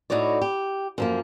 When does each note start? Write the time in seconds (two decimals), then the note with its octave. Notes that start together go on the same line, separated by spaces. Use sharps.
0.10 A2 D#4 F#4 C#5 D5
0.41 G4
0.98 F#2 F3 A#3